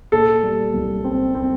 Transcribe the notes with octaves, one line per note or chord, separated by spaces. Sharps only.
A#2 A4
G3
C2
C4
C4